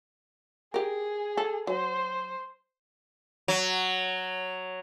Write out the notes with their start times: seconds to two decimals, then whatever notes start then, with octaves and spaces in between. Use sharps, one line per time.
0.74 G4 G#4 A#4
1.37 A4
1.67 F#3 C5
3.48 F#3